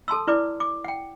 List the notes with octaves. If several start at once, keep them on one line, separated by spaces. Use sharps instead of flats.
A4 A5 C6 E6
E4 B4 D5 D6
D6
F#5 G5